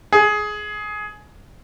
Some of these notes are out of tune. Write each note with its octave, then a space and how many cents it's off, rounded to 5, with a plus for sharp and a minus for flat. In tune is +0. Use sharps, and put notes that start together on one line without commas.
G#4 +15